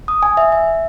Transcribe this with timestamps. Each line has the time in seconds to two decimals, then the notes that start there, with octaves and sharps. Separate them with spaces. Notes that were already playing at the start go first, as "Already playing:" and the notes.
0.08 D#6
0.23 G#5
0.37 E5
0.52 E5